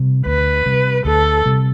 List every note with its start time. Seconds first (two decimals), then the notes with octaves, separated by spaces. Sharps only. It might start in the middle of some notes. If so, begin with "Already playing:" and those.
Already playing: C3 G3
0.26 D2 B4
0.66 C3 G3
1.05 D2 A4
1.45 C3 G3